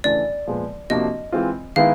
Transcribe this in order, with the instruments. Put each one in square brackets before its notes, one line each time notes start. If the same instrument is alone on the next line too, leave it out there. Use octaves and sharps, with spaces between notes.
[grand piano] C#3 E3 A3 D4 [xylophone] D5
[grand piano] A#2 F3 G#3 B3
[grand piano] C3 F3 A#3 D4 F#4 [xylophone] D#5
[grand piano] E3 G#3 C4 F4
[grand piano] D#3 G#3 B3 E4 [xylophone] F5